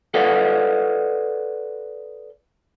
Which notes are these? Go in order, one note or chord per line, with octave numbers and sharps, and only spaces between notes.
A4 B4 D5 D#5 F5 F#5